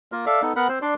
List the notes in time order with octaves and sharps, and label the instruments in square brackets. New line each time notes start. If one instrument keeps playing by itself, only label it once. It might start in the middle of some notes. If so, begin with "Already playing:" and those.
[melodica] A#3 F4 A#4
A4 D5 E5 F5
B3 D#4 A4
B3 A#4 F#5 B5
C4 C5
D4 D5 C6